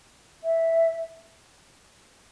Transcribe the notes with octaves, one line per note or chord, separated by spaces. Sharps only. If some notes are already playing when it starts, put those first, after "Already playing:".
E5